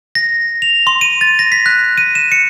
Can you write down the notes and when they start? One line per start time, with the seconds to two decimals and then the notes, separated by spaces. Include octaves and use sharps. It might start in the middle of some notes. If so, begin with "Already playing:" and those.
0.15 A#6
0.62 F7
0.87 C6
1.01 D#7
1.21 A6
1.39 A#6
1.52 B6
1.66 F#6
1.98 D#7
2.15 E7
2.32 C#7